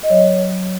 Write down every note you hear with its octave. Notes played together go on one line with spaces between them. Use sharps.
D#5
F#3 C#5